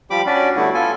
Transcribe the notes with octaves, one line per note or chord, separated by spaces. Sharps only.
F3 G3 G4 B5 D6
C#4 D4 F#4 D5
D3 G3 A3 B3 E4 F#4
B3 F4 A4 G#5